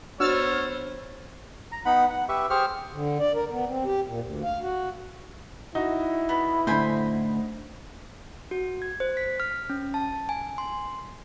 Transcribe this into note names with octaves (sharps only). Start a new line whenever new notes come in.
B3 D4 F#4 C5 C#5 E6 F6 A6
A#5
B3 D#4 F#5 B5
F#5
G4 B4 E5 C#6
G4 G#4 C5 C#6 F6
D3
D5
A#4
B3
C4
G4
A#2
D2
F5
F#4
D#4 E4 F#4
B3
A2 D3 C5 G#5 B5
F#4
G#6
C5
B6
F6
C#4
A5
G#5
C6